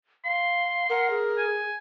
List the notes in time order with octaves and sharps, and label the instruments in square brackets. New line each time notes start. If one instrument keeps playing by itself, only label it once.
[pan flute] F5 [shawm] C6
[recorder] A#4 [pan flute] F#5
[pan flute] G#4
[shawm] G#5